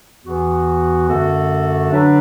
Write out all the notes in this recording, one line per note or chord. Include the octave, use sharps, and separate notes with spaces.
E2 E3 B3 F#4
F#2 D3 A3 F#4 A4
D3 F#3 D4 B4